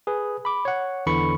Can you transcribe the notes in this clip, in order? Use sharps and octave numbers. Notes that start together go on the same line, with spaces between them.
G#4 B4
B5 D6
C#5 F#5
E2 D3 E3 B5 C#6 C#7